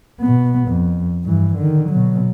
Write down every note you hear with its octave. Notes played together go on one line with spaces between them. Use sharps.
B2 B3
F2
G2 E3
D3 D#3
B2 F#3